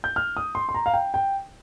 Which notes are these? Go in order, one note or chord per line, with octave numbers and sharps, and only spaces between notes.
G6
F6
D#6
C6
C6
A#5
F5
G5
G5